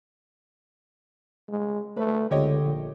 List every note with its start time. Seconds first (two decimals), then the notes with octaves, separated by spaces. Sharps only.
1.48 G#3
1.97 A3 B4
2.31 C#2 D3 G4 C#5 D#5
2.62 A#1